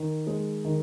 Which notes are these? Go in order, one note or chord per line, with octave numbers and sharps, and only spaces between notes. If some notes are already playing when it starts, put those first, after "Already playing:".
Already playing: D#3
G#3
D#3